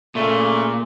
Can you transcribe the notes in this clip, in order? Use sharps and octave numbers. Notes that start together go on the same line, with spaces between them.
A#2 C#3 A3